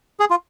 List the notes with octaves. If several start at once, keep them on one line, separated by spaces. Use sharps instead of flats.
G#4
F4